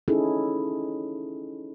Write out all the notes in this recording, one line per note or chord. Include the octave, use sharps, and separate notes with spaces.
C#4 D#4 E4 G#4 A4